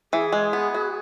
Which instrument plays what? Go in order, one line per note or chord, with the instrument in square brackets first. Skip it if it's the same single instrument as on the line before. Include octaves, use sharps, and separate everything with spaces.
[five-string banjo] E3 [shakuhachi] G#4
[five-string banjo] G#3
B3
F#4